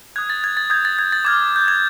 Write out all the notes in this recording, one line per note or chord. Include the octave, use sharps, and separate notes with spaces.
D#6 F#6 G#6
A6
G#6
A6
D#6 G6 G#6
A6
G#6
A6
D6 F6 G#6
G6
G#6